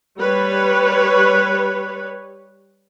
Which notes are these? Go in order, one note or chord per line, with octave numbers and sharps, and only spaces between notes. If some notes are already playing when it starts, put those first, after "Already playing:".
G3 B4 C#5